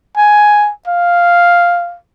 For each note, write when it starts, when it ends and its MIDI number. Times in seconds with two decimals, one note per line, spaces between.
0.17 0.71 80
0.87 1.97 77